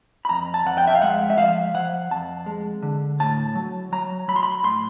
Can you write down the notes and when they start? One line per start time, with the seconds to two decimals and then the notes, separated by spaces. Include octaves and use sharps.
0.25 B5
0.29 F2 A#5
0.54 A5
0.66 F2 F#5
0.78 G5
0.87 E5
0.95 F5
1.02 G#3 F#5
1.30 E5
1.38 F3 F5
1.74 F3 F#5
2.11 F2 A5
2.46 G#3
2.83 D3
3.20 A2 A5
3.55 F#3
3.92 F#3 A#5
4.28 F#3 B5
4.36 C6
4.43 B5
4.64 A2 C6